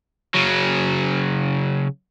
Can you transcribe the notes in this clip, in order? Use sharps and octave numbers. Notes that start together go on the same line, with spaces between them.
C#3 F#3